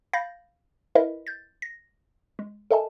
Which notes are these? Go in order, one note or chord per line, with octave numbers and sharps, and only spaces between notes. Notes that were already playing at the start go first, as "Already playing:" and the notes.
F5 B5 G6 A6 A#6
E4 A#4 B4 D#5 E5
G6 A6
A#6
G#3
A4 A#4 D#5 E5 G#5 A5